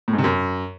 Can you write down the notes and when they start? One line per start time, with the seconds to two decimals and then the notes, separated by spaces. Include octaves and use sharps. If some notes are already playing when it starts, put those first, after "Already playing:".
0.08 A2
0.13 G#2
0.18 C3
0.24 F#2